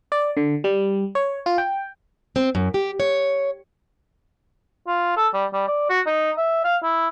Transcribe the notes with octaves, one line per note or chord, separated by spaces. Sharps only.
D5
D3
G3
C#5
F4
G5
C4
F#2
G4
C#5
F4
A4
G3
G3
D5
F#4
D#4
E5
F5
E4